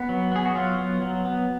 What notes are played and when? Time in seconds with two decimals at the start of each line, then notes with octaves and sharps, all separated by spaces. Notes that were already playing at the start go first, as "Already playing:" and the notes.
Already playing: B3
0.09 F#3
0.32 B3 G#4
0.45 F#4
0.55 F#3 F4
0.78 B3
1.02 F#3
1.25 B3